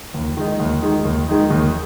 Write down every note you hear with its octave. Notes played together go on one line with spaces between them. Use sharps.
D#2
D#3 G#3 D#4
D#2
D#3 G#3 D#4
D#2
D#3 G#3 D#4
D#2